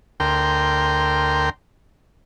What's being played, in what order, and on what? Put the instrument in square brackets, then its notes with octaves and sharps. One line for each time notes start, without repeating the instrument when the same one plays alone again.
[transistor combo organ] D2 A#4 G5 C6